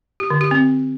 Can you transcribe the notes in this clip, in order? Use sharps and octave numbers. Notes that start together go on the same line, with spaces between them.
G4
D3
G4
C4